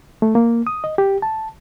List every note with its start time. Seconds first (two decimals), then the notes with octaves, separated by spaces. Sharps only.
0.22 A3
0.35 A#3
0.67 D#6
0.84 D#5
0.98 G4
1.22 A5